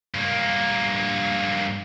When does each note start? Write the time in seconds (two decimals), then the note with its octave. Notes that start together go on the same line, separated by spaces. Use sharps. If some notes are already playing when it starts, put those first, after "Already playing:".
0.14 G2 A#3